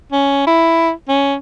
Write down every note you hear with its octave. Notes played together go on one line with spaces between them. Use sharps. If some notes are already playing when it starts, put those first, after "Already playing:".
C#4
E4
C#4